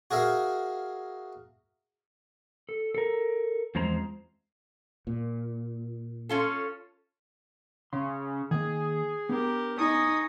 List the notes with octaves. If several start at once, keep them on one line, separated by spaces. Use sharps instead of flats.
F#4 G#4 A#4 E5 F5
A4
A4 A#4
E2 F3 G#3 C4 C5 A#5
A#2
C#4 F4 A4
C#3 C6
D#3 A#3 G#4
B3 D4 G4 A#4
D#4 G#5 C#6 D#6